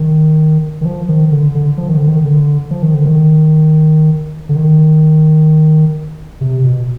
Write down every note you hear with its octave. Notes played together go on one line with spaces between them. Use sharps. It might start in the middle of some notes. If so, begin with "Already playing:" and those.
Already playing: D#3
D#3
F3
D#3
D3
D3
F3
D#3
D3
D#3
D3
F3
D#3
D3
D#3
D3
D#3
C3
B2